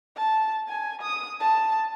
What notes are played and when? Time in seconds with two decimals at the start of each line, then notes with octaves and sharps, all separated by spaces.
0.17 A5
0.69 G#5
1.02 D#6
1.40 A5